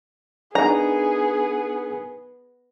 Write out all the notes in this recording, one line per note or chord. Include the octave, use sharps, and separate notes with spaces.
B3 D4 D#4 G#4 A#4 A#5